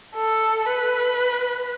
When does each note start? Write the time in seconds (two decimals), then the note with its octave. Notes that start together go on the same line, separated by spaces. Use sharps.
0.15 A4
0.66 B4